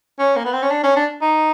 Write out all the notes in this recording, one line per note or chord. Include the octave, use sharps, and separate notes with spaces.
C#4
A#3
B3
C4
C#4
D4
C#4
D4
D#4